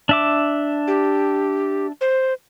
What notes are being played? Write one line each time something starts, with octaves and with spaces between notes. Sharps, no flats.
D4 E5 D6
G4
C5